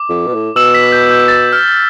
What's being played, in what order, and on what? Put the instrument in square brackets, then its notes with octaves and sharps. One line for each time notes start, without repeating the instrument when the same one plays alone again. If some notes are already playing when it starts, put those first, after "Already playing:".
Already playing: [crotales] D6
[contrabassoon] F2
B2
A2
[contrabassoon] B2 [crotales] E6 E7
[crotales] B6
G6
G6
A6
F6